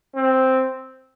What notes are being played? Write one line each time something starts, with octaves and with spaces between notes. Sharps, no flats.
C4